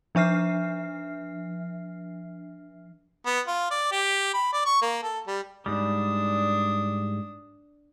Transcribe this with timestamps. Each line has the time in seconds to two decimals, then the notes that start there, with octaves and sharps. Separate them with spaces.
0.15 F3 D4 E5 F6 C7
3.26 B3
3.47 F4
3.71 D5
3.92 G4
4.34 B5
4.53 D5
4.65 C#6
4.82 A#3
5.03 A4
5.27 G3
5.66 G#2 G3 D4 D#6